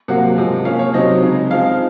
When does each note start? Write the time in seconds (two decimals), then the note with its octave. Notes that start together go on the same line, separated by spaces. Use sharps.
0.08 C3 F#3 A#3 F#5
0.36 C3 F3 G#3
0.65 F3 A#3 C#4 F5
0.79 C#5
0.94 C3 F#3 C4 D#4 D#5
1.22 C#3 G#3 C4 D#4
1.51 F3 G#3 C4 D#4 F5